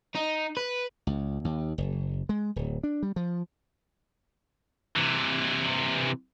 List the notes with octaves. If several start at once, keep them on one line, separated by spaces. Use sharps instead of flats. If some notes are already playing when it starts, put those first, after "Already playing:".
D#4
B4
C#2
D#2
F#1
G#3
D1
D4
G3
F3
C3 E3